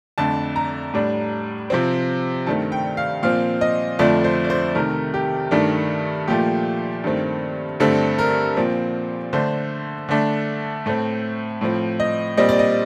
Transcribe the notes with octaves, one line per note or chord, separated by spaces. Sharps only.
F2 D3 A3 D4 A5
A#5
A2 G3 D4
C3 F3 C4
G2 D#3 A3 C4 A5
G5
F5
A#2 F3 C4 F5
D#5
F2 D3 F3 A3 D4 D5
C5
D5
C5
C3 D#3 A3 A#4
G4
G2 D#3 A3 D4
A#2 F3 A3 G4
G2 D#3 A3 C4
G2 D3 A3 C4 A4
A#4
A#2 F3 C4
D3 A3 D4 C5
D3 A3 D4
A2 A3 C4
A2 F3 C4
D#5
A#2 G3 C4 D#5
D5
D#5